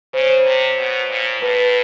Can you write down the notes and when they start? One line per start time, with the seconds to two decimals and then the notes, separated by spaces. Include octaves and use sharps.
0.14 C#3 C5
0.21 C#5
0.29 C5
0.45 C3
0.78 B2
1.10 A#2
1.42 A2 B4